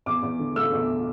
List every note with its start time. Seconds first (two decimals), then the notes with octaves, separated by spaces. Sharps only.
0.06 E2 D6
0.23 E2
0.39 D3
0.56 A3 E6
0.72 E2